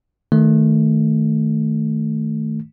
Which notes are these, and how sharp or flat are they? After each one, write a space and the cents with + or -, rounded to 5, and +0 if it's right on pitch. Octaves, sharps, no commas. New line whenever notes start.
D#3 +5 A3 +0